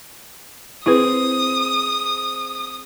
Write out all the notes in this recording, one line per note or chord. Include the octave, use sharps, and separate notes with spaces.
C4 E4 G#4 B4 D#6